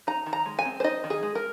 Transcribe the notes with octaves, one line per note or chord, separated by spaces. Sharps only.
D#4 A#5
D#3
A#5
G#3
G#5
C4
C5
D#4 D#5
D#3
G#4
G#3
A#4